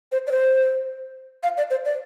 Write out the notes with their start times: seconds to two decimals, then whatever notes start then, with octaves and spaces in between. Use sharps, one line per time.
0.12 C5
0.27 D5
0.32 C5
1.43 F5
1.57 D5
1.70 C5
1.85 D5